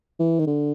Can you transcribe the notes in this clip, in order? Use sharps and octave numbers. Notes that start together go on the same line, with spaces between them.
E3
D#3
D3